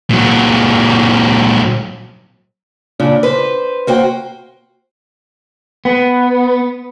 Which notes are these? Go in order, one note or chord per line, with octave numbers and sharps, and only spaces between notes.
A#2 F#3
A#2 C#3 D4
B4 C5
A#3 F#4 C5 G5
B3